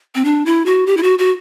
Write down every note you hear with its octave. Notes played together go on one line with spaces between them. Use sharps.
C4
D4
E4
F#4
G4
E4
F#4
F#4